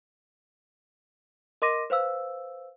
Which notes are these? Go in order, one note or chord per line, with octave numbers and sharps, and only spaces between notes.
A#4 D#5 C6 D6 A#6 D#7
B4 C5 F5 E6